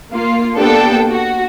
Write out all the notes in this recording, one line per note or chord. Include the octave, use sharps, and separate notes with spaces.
A#3 F4
A#3 B3 D4 G4 A4 G5
F#4